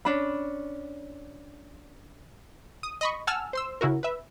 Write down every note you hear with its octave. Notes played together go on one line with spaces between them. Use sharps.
C#4 D4 B5
D#6
D#5 B5 C#6
F#5 G#5 A5 E6 F6
C5 C6 E6
C#3 E4 F#4 A#4
B4 E5